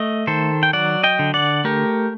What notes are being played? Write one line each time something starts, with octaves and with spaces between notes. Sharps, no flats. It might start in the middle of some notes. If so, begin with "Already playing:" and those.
Already playing: A3 D#5
D#3 A4 C5
G5
F#3 D5 F#5
D#5 G5
D3
D5 F#5
A3 G4 A#4